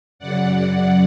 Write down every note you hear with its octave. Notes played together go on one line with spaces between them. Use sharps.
F#2 C#3 F#3 D5 F#5